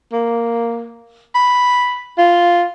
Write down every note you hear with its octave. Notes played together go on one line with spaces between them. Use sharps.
A#3
B5
F4